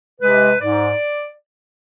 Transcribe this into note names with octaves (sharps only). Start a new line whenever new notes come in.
C3 G#3 B4
G#2 D5